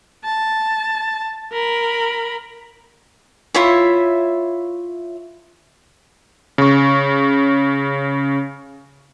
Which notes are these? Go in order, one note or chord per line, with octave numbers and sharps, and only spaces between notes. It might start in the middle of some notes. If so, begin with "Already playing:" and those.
A5
A#4 B5
E4 F4 C#5 E5
C#3 C#6